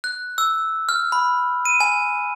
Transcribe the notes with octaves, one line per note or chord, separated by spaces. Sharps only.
F#6
E6
F6
B5
D#7
G#5